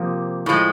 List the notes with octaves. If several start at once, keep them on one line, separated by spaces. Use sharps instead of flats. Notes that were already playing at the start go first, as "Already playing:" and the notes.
Already playing: C3 F3 A#3
A2 F3 G#3